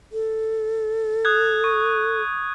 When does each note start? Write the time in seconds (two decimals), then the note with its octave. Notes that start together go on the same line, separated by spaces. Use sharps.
0.12 A4
1.25 D#6 F#6 G#6
1.64 C#6